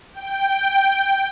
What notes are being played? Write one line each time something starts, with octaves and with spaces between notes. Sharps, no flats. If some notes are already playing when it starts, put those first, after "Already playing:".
G5